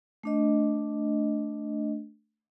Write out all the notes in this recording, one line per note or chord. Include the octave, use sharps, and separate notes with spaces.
A3 D4 D#5